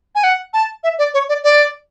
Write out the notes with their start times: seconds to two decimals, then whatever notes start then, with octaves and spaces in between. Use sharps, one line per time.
0.15 G#5
0.24 F#5
0.53 A5
0.84 E5
0.99 D5
1.14 C#5
1.29 D5
1.44 D5